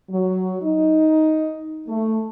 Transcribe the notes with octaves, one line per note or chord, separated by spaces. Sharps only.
F#3
D#4
A3